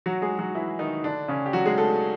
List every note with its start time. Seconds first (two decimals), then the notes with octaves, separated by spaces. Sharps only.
0.06 F#3 F#4
0.22 G#3 G#4
0.38 F#3 F#4
0.55 E3 E4
0.79 D#3 D#4
1.04 D3 D4
1.28 C#3 C#4
1.46 G4
1.53 F#3 F#4
1.65 G#3 G#4
1.78 A3 A4